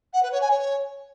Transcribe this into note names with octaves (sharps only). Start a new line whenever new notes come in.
F#5
B4
C#5
G#5
C#5